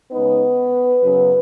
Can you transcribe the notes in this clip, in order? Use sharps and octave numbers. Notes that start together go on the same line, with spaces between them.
C#3 G#3 B3 D#4 B4
F#2 C#3 F#3 B3